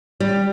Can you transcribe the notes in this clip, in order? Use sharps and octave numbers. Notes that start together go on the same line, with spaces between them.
G3